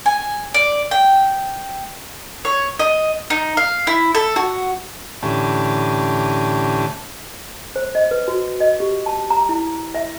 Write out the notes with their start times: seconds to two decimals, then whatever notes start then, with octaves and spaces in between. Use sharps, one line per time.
0.06 G#5
0.54 D5
0.91 G5
2.45 C#5
2.79 D#5
3.30 D#4
3.57 F5
3.87 E4
4.15 A4
4.36 F#4
5.23 A2 D3 E3 C#4 G4 A5
7.76 C5
7.95 D#5
8.11 B4
8.28 F#4
8.60 D#5
8.80 G4
9.06 A5
9.30 A#5
9.49 E4
9.95 E5